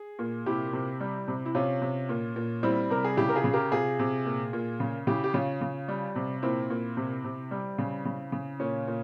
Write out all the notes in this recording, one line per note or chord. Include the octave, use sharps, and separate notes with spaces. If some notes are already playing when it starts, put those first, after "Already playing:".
Already playing: G#4
A#2
C3 E4 G4
C3
G3
C3
E4
C3 C#4 F4
C3
A#2
A#2
G3 C4 E4
C3 A#4
G#4
C#3 E4 G4
A#4
F4 G#4
C#3
G4 A#4
C3 F4 G#4
C3
A#2
A#2
C#3
C#3 E4 G4
G4
C#3 C#4 F4
C#3
G3
C3
A#2 C4 E4
A#2
C3
C3
G3
C#3
C#3
C#3
A#2 C#4
A#2